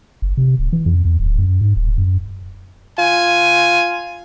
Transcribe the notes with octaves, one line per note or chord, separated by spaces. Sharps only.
F#1
C3
D1
E3
F2
E2
D1
F#2
G#2
D#1
F#2
F4 G#5